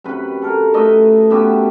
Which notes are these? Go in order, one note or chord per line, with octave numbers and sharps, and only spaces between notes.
F#2 C3 B4 B5
A4 A#4
A3 B4 D#5 E5
F#2 B3 G4 E5